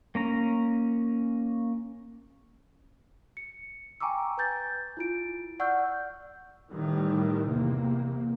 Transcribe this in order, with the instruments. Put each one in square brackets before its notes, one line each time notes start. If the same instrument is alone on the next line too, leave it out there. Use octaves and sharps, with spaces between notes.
[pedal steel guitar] A#3 C#4 A#5
[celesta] C#7
G5 G#5 A#5 C#6 D6 E6
B4 G#5 G6 A6
E4 F4 D7
D5 F#5 C#6 E6 F6 G6
[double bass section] A2 D#3 E3 G3
E2 C3 A#3